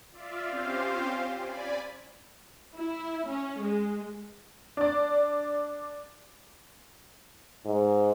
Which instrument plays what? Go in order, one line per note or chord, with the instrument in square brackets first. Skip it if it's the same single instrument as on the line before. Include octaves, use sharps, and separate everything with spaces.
[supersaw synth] F4 D5 E5 F5
C4 C#4 F4 G4 C5 F5
D5 G#5 B5
[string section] E4
C#4
G#3
[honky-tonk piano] D4 D5
[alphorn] G#2